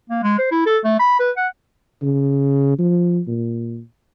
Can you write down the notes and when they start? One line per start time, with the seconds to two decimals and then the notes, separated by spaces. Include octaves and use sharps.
0.10 A#3
0.23 G#3
0.38 C5
0.51 E4
0.66 A4
0.84 A3
1.00 B5
1.20 B4
1.37 F#5
2.02 C#3
2.79 F3
3.28 A#2